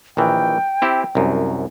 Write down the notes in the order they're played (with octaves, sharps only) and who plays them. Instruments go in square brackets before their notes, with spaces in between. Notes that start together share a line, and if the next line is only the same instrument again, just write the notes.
[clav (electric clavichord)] A#1 D#3 E3 [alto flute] G5
[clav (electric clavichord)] C4 E4 G4
C2 F#2